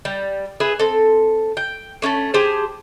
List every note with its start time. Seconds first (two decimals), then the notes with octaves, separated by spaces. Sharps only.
0.05 G3
0.60 G#4 B4 E5
0.80 C4 A4
1.57 G5
2.02 A3 C#4 G4 A4
2.34 G4 G#4 C5 A5